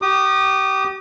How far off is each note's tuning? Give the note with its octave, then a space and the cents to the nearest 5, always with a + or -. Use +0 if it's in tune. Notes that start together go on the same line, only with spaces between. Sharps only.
G4 -30 D#6 -35